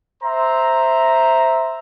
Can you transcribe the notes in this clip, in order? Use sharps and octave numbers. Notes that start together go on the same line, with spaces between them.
C5 E5 A#5 C6